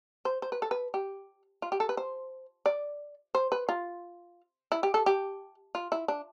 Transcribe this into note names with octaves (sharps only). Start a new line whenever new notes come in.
C5
C5
B4
A4
B4
G4
F4
G4
A4
B4
C5
D5
C5
B4
F4
E4
G4
A4
G4
F4
E4
D4